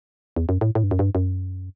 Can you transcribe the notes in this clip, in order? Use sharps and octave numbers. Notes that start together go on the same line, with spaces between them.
E2
F#2
A2
A2
G2
F#2
G2
F#2